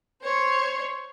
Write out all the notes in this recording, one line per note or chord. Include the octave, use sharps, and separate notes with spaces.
C5 C#5